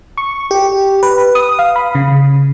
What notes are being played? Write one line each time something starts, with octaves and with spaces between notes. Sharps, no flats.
C#6
G4
B4
D#6
F5
B5
C#3